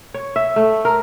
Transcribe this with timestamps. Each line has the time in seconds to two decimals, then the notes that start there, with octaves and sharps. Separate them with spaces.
0.14 C#5
0.36 E5
0.56 A3
0.85 A#4